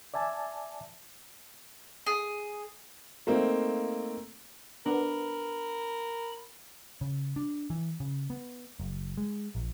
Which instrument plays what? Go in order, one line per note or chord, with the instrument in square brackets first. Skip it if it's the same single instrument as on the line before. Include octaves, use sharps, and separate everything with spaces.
[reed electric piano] D5 E5 G#5 A5
[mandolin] G#4
[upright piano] A3 A#3 C4 D#4
[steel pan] B3 D4 [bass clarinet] A#4 [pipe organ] B5
[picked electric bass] C#3
D4
E3
C#3
B3
F#1
G#3
A#1